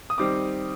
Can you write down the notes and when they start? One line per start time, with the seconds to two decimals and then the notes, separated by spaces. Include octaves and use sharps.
0.10 D#6
0.18 D#3 G3 C4 D6